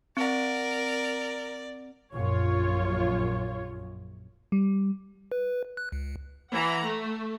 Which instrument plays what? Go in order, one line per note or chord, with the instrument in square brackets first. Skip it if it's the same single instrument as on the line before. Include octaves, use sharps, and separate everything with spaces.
[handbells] C4 F#5 [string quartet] A#4 [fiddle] D5
[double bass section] A#1 F#2 [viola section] F4 C#5
[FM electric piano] G3
[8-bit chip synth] B4
F#6
C#2
[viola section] E3 F#5 A#5
A3